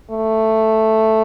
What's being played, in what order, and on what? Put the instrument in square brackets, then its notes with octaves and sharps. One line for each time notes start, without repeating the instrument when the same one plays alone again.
[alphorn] A3